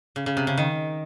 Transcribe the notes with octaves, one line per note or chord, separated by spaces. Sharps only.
C#3
C#3
C3
C#3
D#3